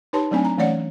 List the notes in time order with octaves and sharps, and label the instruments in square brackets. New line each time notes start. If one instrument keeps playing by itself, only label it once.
[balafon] D#4 G4 B4 C#5 A5 C6
F#3 A3 C4 D4 G#5
A#5
E3 A3 C#4 C#5 D5 F#5